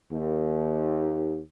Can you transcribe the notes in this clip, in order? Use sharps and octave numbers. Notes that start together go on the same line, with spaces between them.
D#2